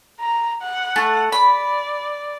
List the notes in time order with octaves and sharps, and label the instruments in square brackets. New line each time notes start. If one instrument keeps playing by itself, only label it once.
[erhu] A#5
F#5
[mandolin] A3
[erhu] D5 [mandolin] B5